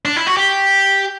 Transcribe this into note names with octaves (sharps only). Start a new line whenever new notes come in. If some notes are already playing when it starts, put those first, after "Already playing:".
D4
E4
F#4
G4